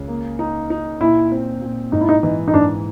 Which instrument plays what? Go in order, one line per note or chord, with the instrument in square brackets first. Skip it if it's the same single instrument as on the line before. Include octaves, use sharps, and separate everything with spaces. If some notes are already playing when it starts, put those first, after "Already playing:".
Already playing: [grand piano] C#2 C#3
A#3
D#4
D#4
[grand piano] A#2 [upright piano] E4
[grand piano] C4
A#2
[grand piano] G#2 [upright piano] D#4
[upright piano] E4
D#4
[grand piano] E3 [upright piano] D#4
[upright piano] D#4
[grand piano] G#2 [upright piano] D4